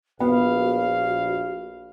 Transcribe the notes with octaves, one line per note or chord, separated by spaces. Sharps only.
A#1 B3 F#4 F5